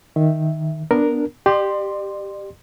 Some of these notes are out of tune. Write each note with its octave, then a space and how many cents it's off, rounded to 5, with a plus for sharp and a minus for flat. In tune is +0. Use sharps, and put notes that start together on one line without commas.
D#3 +0 E5 +0
B3 +0 D4 +0 A#4 +0
G4 +0 D5 +40 C6 +0